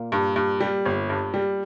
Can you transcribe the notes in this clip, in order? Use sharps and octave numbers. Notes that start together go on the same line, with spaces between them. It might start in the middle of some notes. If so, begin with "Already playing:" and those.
Already playing: A#2 A#3
G2
G2
G3
G1
G2
G3